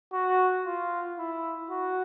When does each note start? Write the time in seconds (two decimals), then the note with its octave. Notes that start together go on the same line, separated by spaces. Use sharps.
0.13 F#4
0.65 F4
1.19 E4
1.70 F#4